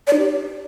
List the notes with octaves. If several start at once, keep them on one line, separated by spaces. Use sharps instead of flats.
D5
D#4
G4